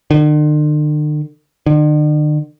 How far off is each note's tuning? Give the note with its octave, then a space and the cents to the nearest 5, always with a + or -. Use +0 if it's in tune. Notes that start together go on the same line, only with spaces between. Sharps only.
D3 +45
D3 +45